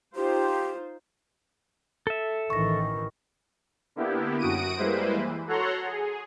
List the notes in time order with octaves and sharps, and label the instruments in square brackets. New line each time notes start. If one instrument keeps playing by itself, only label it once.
[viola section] D#4 F4 C5 [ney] G4
[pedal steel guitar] A4 E5
[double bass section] A1 D#3 E3 [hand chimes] C#6 A#6
[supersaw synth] D3 A#3 B3 E4 G4
F#2 F#4 D#6 D7 D#7
G3 G#3 A#3 E4 B4 C5
E3
F#4 A4 C#5 F#5 A#5 C6
G#4